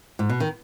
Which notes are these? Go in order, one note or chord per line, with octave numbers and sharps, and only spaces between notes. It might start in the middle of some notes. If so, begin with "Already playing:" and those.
G#2
B2
D#3